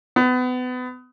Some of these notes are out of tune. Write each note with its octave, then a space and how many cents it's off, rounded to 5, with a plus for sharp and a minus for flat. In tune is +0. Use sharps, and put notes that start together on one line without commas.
B3 +30